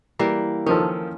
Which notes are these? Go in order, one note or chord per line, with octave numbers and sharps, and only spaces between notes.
E3 G3 A#3
D#3 F3 C#4 A4